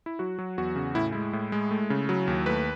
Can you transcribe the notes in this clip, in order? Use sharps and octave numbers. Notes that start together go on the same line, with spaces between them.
E4
F#3 F#4
F#3
E2 F#4
C#3
A2 E4
G#3 E4
A2
G#3
A3
C#3
F#3
D#2
A3 B4